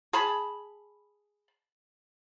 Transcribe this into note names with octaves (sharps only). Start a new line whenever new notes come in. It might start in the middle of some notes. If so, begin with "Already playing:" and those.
G#4 A5 B5